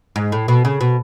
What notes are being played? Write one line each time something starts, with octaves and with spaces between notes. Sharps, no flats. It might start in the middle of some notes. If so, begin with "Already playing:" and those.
G#2
A2
B2
C#3
B2